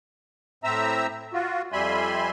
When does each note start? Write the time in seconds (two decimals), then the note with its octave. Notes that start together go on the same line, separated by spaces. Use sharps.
0.64 A2 C4 E5 A#5 E6
1.33 F4 F#4
1.72 F2 G3 E5 G#5 B5 C6